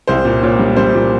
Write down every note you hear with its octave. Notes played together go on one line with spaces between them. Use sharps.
C2 C5
A#2
A#2 C#5
G3
G3 C5
A#2